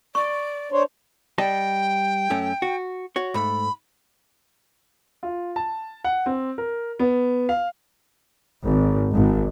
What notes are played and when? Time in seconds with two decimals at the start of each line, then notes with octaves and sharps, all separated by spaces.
0.15 D5 C#6
0.72 D4 C5 C#5
1.38 G3 D#5 G5 A5
2.30 F#2 A3 C#4
2.62 F#4
3.16 F#4 C#5
3.34 G#2 A3 B5
5.23 F4
5.56 A5
6.04 F#5
6.26 C4
6.58 A#4
6.99 B3
7.49 F5
8.64 G#1
9.12 G#1